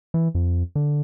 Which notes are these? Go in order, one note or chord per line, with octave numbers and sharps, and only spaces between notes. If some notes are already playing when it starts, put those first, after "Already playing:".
E3
F2
D3